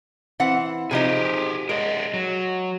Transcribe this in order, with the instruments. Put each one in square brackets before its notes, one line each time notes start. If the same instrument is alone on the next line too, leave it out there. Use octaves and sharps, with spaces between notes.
[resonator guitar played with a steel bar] E3 C4 F#5
[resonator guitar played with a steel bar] C3 F3 D#4 [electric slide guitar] G4 G#4
[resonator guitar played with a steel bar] G#3 [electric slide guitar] A#4 D5 D#5
[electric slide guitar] F#3